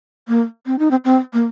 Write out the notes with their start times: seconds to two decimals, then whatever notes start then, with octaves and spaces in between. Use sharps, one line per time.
0.28 A#3
0.66 C4
0.79 D#4
0.91 C4
1.05 C4
1.33 A#3